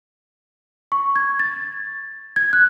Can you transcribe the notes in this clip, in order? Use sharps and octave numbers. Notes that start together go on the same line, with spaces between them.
C#6
G#6
A6
G#6
F#6